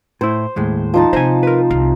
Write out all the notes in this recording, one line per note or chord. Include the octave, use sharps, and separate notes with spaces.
A2 E4 C5
D#2 A2 G#3
F3 D#4 A5
C3 C5 D#5 G#5
A#4 B4
C2 F4